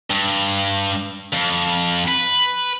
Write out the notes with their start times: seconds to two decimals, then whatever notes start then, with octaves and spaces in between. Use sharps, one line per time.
0.10 G2
1.33 F2
2.08 B4